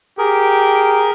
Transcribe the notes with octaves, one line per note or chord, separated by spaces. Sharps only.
G4 G#4 A#4